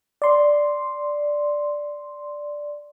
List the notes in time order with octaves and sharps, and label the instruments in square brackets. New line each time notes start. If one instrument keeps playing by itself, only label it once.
[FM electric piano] D5 C6